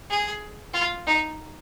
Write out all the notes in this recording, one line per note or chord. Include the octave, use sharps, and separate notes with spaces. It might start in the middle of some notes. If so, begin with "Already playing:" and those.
G#4
F4
D#4